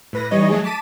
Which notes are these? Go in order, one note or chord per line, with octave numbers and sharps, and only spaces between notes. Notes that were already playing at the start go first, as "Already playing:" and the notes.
A2 B4 A#6
E3 G3 D#4 C#5 D#5
F#3 A3 G#4
A5 D6 B6 D#7